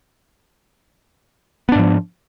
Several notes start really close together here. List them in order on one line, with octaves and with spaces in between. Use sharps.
B3 D4 G#2 F3